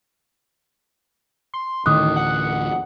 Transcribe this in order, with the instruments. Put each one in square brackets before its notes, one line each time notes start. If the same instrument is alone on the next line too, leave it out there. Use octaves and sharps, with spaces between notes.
[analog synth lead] C6
[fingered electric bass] D2 A2 E3 [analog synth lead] D#3 [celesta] D6 D#6 F#6
[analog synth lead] F#5